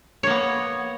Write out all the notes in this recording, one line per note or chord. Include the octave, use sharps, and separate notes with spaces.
A#3 B3 C#5